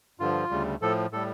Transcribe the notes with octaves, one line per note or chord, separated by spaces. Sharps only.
G2 D3 F3 F4
D2 C#3 G3
A2 F3 A4
A2 G3 A4